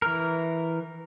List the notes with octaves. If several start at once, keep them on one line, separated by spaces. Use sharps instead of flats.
E3 A#4